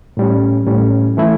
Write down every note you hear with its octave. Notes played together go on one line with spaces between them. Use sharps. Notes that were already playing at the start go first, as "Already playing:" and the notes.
A2 G3 C#4
A2 G3 C#4
E3 A3 E4